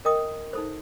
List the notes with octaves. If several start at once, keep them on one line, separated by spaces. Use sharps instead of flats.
A#4 D#5 G5 D#6
D#4 A4 C5